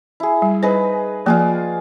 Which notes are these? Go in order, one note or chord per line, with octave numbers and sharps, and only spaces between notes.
E4 G#4
G3
D#4 G#4 B4 C5
F3 A#3 F4 G#4 D5